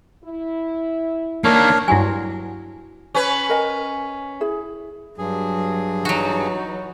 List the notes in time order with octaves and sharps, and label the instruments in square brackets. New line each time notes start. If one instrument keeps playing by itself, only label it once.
[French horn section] E4
[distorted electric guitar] D#3 A#3 [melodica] D4 A#4 C#5
[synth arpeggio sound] G2 F#3 [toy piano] E4 F#4 G#5
[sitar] C#4 B4
[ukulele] A#4 D#5 G#5
E4 G#4
[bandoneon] G2 G#4 [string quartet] F#3
[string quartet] E3 D#4 [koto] F#3 F#4